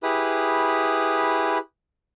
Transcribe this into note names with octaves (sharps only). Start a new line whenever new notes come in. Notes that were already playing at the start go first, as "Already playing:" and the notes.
E4 G4 G#4 B4 B5 D#6